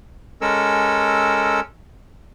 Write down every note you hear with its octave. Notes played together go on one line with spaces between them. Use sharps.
G#3 C#4 A4 A#4 E6